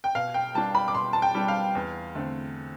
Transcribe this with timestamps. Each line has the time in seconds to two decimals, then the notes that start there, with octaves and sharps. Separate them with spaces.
0.04 G5
0.15 B2 F5
0.34 G5
0.55 G3 D4 A5
0.75 B5
0.88 D6
0.95 B2 C6
1.13 A5
1.22 G5
1.34 G3 D4
1.48 F5
1.75 E2
2.15 D3 A3 C4